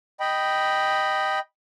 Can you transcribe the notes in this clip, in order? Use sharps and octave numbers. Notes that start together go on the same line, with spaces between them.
D#5 G5 B5